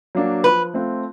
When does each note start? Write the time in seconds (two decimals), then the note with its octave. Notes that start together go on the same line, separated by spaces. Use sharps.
0.15 F#3 A#3 D4 F#4
0.44 F3 B4
0.74 A3 C4 F4